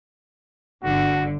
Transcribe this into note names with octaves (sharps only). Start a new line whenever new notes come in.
G1 D3 F#4